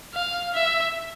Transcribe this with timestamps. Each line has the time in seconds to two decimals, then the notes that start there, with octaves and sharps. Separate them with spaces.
0.14 F5
0.54 E5